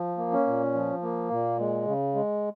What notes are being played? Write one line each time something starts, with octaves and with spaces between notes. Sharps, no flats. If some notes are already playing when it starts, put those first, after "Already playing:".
Already playing: F3
A#3
C#4
A#2
F3
A#3
A#2
G#3
C#3
G#3